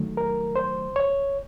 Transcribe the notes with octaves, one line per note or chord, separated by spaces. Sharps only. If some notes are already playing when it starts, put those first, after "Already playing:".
Already playing: D#3 F#3 A3
A#4
C5
C#5